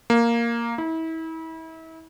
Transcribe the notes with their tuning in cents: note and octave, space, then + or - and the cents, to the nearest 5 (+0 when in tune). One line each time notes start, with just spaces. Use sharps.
A#3 +0
E4 -35